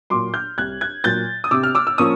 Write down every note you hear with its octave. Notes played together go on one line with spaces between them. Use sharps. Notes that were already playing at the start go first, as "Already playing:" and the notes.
A#2 F#3 C6 D6
F6 G6
C2 F#6 G#6
F#6 G#6
A#2 F#3 G6 A6
D#6
C3 D6 E6
F6
D6 E6
E6
F3 A#3 C#4 C#6 D#6